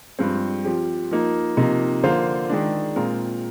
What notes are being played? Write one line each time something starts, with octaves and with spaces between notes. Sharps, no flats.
G2 F3 G#3 C4
F3 C4 G4
F3 A#3 D#4
C3 F3 A#3 D#4
D3 F3 A#3 F4 C5
D#3 G#3 D4
A#2 G#3 C4 F4 A#4